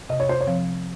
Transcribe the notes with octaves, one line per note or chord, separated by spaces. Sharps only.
C3 D#5
C#5
C5
C#5
F3 C4